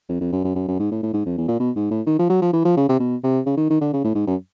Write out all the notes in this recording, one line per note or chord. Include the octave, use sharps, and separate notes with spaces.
F2
F2
F#2
F#2
F#2
F#2
G#2
A2
A2
G#2
F2
E2
A#2
B2
G#2
A2
D#3
F3
F#3
F3
E3
F3
C#3
C3
B2
C3
C#3
D#3
D#3
D3
C#3
A2
G#2
F#2